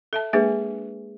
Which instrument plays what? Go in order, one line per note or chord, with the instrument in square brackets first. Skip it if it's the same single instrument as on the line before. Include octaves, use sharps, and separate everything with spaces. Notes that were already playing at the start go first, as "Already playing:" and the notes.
[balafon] A4 E5 A5
[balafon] G#3 A#3 E5 [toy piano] D4 G#4 B4